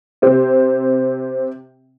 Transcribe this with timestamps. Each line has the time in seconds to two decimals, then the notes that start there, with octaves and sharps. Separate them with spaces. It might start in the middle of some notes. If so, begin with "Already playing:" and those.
0.22 C3 C4